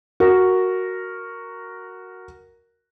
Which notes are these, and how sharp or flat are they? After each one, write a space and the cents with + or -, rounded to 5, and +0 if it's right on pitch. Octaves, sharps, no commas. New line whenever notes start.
F#4 +0 A#4 -5